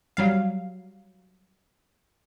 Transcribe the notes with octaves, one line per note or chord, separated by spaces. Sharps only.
F#3 G3 F5